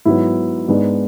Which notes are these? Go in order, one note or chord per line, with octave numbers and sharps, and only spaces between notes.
G#2 F#3 B3 E4
G#2 G#3 B3 D4